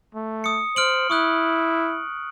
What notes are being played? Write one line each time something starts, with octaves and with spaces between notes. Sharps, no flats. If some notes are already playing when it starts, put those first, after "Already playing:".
A3
D#6 C#7
C5 F6 D7 F#7
E4 C#6 D#6 F#6